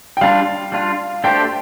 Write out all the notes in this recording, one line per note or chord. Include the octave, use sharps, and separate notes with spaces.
G5
G3 D4 F4 F5
G3 D4 F4
A3 D4 G4 C5 G5